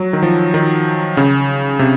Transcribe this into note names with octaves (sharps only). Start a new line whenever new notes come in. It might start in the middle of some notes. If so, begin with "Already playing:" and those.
Already playing: F#3
D#3
F3
D#3
C#3
C3